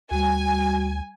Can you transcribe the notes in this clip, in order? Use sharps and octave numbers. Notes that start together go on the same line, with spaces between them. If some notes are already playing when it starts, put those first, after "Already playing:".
D2 G3 F#4 G#5